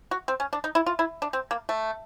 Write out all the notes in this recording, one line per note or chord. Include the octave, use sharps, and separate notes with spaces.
F#4
C4
C#4
D4
D#4
E4
F4
E4
D4
C4
A#3
A3